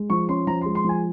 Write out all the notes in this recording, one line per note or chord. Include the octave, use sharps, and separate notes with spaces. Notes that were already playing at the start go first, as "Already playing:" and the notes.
Already playing: G#3
F3 C#6
C#4 C6
F3 A#5
G#3 C6
C6
F3 G#5